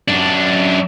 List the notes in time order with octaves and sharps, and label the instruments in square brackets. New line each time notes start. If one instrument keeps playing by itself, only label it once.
[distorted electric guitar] F#2 D4